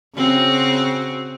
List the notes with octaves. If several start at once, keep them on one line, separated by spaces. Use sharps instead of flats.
C#3 C4 F#4